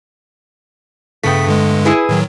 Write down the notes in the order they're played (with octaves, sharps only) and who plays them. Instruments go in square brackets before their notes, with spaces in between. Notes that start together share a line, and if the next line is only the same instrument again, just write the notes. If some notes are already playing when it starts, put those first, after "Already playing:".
[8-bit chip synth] G2 C#3 B6 [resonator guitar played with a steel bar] A3 B3 G5
[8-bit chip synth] G2 D3 G#3
[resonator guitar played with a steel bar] E4 G#4 B4
[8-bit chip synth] A2 D#3 F#3